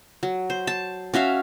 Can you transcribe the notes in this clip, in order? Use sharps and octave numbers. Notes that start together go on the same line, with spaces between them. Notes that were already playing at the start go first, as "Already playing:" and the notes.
F#3
C5
A5
C#4 F#4 E5 F5